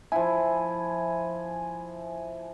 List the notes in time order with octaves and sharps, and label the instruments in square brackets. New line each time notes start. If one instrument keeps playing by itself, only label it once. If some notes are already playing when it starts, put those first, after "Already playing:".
[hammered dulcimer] F3 E4 [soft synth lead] G#5